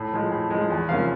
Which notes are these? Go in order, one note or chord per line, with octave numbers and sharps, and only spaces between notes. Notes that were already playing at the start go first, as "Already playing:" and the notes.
Already playing: A2
F3 G#3
A2
F3 G#3
E2
C3 F3 A#3 C#4 F5